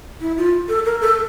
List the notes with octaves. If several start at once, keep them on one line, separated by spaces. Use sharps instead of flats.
E4
F4
A4
A#4
A4